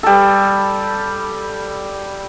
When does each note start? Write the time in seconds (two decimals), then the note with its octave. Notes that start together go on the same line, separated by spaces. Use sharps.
0.03 G3 A4